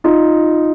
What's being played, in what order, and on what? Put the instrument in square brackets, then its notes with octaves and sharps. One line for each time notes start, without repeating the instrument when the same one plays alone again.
[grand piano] D#4 F4